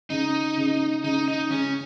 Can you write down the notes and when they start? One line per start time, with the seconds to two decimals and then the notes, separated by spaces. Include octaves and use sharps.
0.10 C#3 D#4
0.57 C#3
1.04 C#3 D#4
1.28 D#4
1.50 C#3 C#4